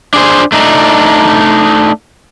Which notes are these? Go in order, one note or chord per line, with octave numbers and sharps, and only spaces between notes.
D4 G#4 C5
A3 D4 D#4